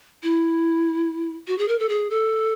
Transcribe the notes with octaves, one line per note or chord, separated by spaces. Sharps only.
E4
F#4
G#4
A#4
A4
G#4
A4